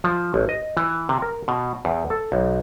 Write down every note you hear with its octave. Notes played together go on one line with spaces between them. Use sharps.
F3
A1
D#5
E3
C3
A#4
B2
E2
A4
B1